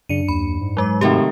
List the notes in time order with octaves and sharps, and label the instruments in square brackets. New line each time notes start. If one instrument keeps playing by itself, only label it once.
[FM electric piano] F#2 D4 C#7 [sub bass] C#3 [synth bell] D#7
[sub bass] D#2 [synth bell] B5
[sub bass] G#2
[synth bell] F#3 G#3 D6
[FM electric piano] C3 F#4 [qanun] D#3 A3 C#5 [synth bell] C4 G4